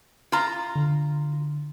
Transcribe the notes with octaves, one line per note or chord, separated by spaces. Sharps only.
F4 A#5
D3